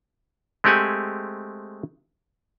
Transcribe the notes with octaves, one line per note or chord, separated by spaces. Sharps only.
G#3 A3 C4 G4 F#5 G#5